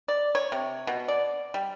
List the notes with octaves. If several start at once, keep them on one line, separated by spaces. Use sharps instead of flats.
D5
C#5
C3
B2
D5
G3